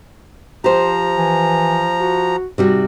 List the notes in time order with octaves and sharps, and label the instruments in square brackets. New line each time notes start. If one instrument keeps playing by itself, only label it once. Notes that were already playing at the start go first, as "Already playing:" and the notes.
[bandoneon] F3 A#5 [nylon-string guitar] G4 C5
[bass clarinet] E3
F#4
[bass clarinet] G#2 [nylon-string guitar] C3 G3 F#4